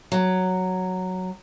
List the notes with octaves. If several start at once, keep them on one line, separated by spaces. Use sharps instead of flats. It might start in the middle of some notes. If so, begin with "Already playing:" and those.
F#3